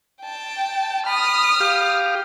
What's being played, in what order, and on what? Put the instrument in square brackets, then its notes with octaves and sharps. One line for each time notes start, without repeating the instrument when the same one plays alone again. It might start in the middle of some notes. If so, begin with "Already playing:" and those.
[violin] G5 A5
[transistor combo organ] B5 [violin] D#6 F6
[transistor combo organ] G4 F5